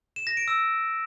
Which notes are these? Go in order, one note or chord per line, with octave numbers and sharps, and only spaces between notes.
E7
A#6
D7
E6